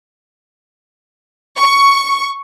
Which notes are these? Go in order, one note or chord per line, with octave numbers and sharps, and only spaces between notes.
C#6